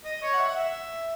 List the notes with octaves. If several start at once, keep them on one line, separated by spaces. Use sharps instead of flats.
D#5
C#5
F#5
E5
F#5
E5